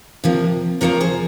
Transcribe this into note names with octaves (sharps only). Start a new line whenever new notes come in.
C3 F3 A#3
C3 F3 A#3 A#4 C#5
G#4 C5